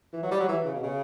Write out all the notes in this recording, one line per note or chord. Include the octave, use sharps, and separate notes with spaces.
E3
F#3
G3
F#3
E3
C#3
B2
C#3